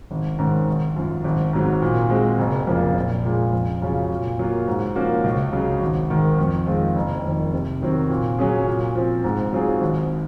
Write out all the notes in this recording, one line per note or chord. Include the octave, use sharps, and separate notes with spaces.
G#1
G#2 D#3 G#3 C#4
G#1
F#2 F3
G#1
G#2 F#3 C4
A#2
G#3 C4 F#4
F#1
F2 C#3 F3 A#3
A#1
A#2 G#3
F2
C#3 F#3 C#4 F4
A#2
F#3 A#3 F4
G#2
F3 A#3 C#4 F#4
C#2
C#3 F#3
G#1
G#2 D#3
F2
D#3 G#3 C4 F4
F#1
F2 D#3
C3
D#3 F#3 C4 F#4
A#2
F#3 C#4 G#4
A#2
F3 C4
G#2
F#3 C4 F4 G#4
G#1